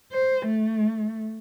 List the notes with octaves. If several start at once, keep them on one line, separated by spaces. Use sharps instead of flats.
C5
A3